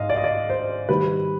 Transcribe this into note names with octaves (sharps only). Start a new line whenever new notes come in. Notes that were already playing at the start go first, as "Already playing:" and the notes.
Already playing: G#1 G#2 D#5 F5
D5
D#5
D5
C5
D#3 G3 B4